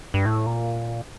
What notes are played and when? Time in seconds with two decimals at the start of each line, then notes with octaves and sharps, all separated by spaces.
0.14 G2
0.26 A2
0.46 A#2